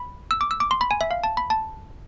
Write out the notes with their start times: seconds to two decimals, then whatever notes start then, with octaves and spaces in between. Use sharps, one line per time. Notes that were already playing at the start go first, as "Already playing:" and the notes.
Already playing: B5
0.31 E6
0.41 D6
0.51 E6
0.60 D6
0.71 C6
0.81 B5
0.91 G#5
1.01 E5
1.11 F5
1.24 A5
1.37 B5
1.50 A5